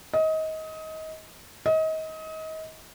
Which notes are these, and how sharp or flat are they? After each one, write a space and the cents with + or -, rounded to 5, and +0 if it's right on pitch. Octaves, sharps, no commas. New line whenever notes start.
D#5 +25
D#5 +30